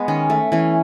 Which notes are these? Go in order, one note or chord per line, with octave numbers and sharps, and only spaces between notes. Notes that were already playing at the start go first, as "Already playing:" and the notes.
Already playing: G#3 B3
D#3 C#4
A3
E3 C#4